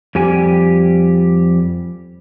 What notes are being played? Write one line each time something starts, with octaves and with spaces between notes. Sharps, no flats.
F2 G3 G4 G#5